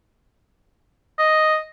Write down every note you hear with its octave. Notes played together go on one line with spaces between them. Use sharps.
D#5